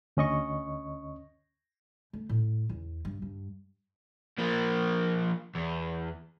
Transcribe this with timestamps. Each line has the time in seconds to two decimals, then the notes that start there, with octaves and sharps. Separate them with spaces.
0.17 D2 C#4 D#5 C#6
2.13 A3
2.29 A2
2.69 E2
3.05 G2
3.22 G2
4.38 F3 A#3
5.55 E2